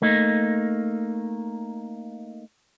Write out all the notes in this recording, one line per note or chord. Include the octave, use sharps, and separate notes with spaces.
A3 A#3 D#4